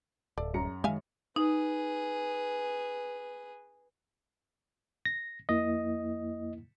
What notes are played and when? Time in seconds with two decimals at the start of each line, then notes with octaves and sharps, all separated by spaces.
0.38 D1 A4 D5
0.54 F#2 A#5 C#7
0.84 D#3 G#3 E5 F5 G#5
1.36 D#4 G#4 B4
5.05 A#6
5.49 F2 A#3 E4 D#5